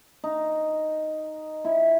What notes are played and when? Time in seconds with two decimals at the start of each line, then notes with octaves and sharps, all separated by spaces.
0.24 D#4
1.65 E4